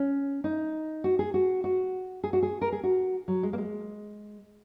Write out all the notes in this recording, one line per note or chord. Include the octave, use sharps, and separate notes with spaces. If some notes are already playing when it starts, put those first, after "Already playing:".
Already playing: C#4
D#4
F#4
G#4
F#4
F#4
G#4
F#4
G#4
A#4
G#4
F#4
F#3
G#3
A#3
G#3